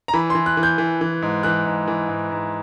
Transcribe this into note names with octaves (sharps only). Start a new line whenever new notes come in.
A#5
E3 B5
C6
E3
F#6
E3
G6
E3
E3
G#2
E3 F#6
G#2
E3
G#2
G#2